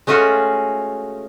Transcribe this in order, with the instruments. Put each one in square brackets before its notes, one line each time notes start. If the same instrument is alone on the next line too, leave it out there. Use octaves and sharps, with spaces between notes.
[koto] G#3 A3 C#4 F4 F#4